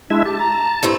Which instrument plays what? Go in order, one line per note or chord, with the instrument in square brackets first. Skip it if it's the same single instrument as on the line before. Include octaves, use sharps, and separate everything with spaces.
[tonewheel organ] G#3 E4 E5 [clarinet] D4
[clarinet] G4 [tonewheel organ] A5
[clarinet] A#5
[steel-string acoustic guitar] G2 A3 C4 [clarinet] E4